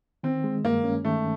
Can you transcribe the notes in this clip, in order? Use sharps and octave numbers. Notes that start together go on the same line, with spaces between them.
D#3 C4
G#3
G2 A#3
C#4
D#3 A3